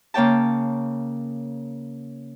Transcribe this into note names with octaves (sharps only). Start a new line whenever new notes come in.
C#3 A#3 C#5 G5 A5